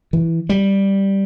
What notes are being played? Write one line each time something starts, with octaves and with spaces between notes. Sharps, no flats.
E3
G3